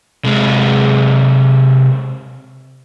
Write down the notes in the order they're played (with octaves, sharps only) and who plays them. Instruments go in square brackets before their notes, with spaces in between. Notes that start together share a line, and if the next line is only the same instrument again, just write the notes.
[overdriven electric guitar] C3 G#3